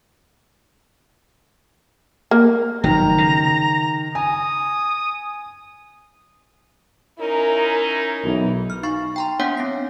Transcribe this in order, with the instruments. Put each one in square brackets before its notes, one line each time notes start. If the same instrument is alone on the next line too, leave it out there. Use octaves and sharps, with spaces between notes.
[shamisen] A#3
[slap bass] F1 F#3 [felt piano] D#3 [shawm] A#5
[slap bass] C#3
[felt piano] G#5 [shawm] D#6
[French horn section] C#4 D#4 E4 [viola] A#4
[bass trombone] B1 [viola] E3
[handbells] F6
D#4 F5 B5 C#6
G5 A#5 C6
B3 D4 C#5 F#5 G#5 B6
C4 A#6 C7